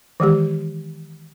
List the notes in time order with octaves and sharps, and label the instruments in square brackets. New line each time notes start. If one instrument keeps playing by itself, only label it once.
[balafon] D#3 E3 G#3 G4